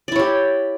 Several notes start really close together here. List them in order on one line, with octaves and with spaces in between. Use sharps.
D5 E4 C#5 G4